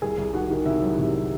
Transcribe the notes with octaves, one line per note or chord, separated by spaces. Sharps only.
C2 G#4 G#5
C2
D#3 F#4 F#5
D#3
C3 E4 E5
F#3
C3